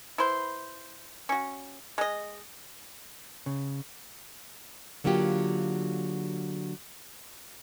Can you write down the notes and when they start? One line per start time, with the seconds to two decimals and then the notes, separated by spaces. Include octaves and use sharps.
0.18 E4 B4 C5
1.29 C#4 F#4
1.98 G#3 D#5
3.46 C#3
5.04 D3 F#3 A#3 F4 G4